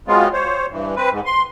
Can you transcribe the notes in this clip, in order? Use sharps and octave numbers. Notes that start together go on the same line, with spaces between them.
F#3 G#3 B3 C4 F4
C5 C#5
G2 E3
C4 B4
G#2
C6